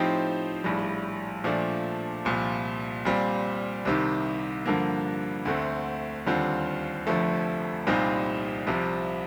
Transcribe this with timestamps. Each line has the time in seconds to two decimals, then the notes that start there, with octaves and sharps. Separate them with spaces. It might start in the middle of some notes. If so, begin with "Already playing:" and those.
Already playing: A2 F3 C4 D#4 G4
0.64 A#1 A2 G3
1.44 A#2 F3 A3 D4
2.25 C2 A#2 F3
3.05 A#2 G3 C4
3.85 C2 C3 D#3
4.66 G2 D3 F3 A#3
5.45 D2 D3 A3 C4
6.26 D#2 D3 G3 C4 F4
7.07 F1 F2 D3 F3 A3
7.87 C2 A#2 G3 C4 D#4
8.67 C2 C3 F3